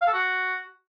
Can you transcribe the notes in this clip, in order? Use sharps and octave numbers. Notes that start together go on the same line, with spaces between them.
F5
A4
F#4